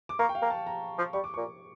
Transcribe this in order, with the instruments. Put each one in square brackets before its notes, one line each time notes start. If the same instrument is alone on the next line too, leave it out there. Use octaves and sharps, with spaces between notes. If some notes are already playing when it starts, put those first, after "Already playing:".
[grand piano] D6
[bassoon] A#3 [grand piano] C#6
[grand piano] G5
F5
[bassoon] A#3
[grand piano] A5
A#5
[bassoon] F3
[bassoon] G3 [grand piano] C#6
[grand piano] D6
[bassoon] A#2 [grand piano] C#6